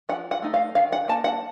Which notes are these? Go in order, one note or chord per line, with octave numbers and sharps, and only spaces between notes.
F3 F#5
F#5
A3 D#4
F5
D#3 F5
F#5
A#3 D#4 A5
F#5